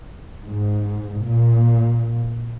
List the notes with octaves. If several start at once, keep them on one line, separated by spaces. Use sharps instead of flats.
G#2
A#2